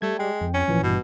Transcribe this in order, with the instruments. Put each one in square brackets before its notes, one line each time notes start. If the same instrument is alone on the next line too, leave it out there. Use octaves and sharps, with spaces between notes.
[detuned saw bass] G3 [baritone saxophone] A3 [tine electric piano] G#6
[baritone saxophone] G#3 [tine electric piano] G5
[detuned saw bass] F2
[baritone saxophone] C#4
[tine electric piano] G#1 A#2 E3 [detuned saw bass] F3
[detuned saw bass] G2 [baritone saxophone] B2